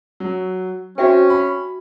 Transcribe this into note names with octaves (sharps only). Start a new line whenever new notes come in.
F#3
C4 C#4 F#4 E5 G5
B5